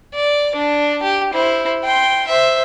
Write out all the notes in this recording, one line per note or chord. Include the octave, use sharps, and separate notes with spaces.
D5
D4
G4
E4 C5
G5 C6
C5 E5